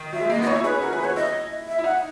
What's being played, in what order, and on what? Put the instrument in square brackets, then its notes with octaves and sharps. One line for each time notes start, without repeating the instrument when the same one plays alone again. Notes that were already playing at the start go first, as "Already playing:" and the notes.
Already playing: [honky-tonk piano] D#3
[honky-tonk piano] F#3 [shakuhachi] E5
[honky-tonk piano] G#3
[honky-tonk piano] A#3 [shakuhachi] D#5
[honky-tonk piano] B3
[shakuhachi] D#5
[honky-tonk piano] D#4 [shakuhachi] C#5
[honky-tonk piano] E4
[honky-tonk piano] G#4 [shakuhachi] B4
[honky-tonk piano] C#4
[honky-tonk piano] F#4 [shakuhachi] A#4
[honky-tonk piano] G#4 [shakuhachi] B4
[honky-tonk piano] F#4 [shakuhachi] C#5
[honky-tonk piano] E4 [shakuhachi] D#5
[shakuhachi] E5
[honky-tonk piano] E4
[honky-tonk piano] D#4 [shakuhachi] F#5